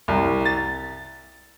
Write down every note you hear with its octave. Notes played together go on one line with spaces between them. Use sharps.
C2
A6